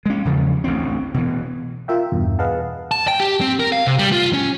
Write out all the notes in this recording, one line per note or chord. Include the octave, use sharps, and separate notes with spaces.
G#3 C#4
E2 C#3 F3
A1 D2 C4
B2 E3
F4 A#4 E5 G5
E2 G2 B2
G#4 B4 D#5 F5 F#5 A5
A5
G5
G4
C4
A#4
F5
C3
G3
F4
C#4